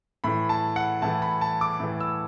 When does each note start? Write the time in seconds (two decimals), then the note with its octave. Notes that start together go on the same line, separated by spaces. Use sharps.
0.24 A2 E3 B5
0.49 A5
0.76 F#5
1.02 A2 E3 A5
1.22 B5
1.41 A5
1.61 D6
1.80 A2 E3
2.00 E6